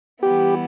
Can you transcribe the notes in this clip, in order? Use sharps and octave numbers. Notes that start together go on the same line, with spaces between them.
E3 G3 B3 E4 G4